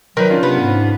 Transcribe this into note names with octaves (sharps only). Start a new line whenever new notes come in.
D#3 F#3 A#4 B4
C#4 D4 F4
C3 B3
G#2